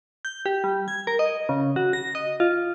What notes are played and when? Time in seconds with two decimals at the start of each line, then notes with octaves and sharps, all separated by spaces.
0.25 G6
0.46 G4
0.64 G3
0.88 G#6
1.07 A#4
1.19 D#5
1.49 C#3
1.76 F#4
1.93 A#6
2.15 D#5
2.40 F4